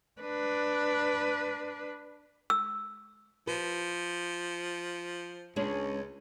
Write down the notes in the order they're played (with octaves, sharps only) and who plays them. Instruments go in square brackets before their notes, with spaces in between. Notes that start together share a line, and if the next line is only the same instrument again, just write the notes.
[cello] D4 B4
[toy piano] E6
[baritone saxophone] F3 [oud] B4
[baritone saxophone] C#2 [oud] G#3 C#4 D4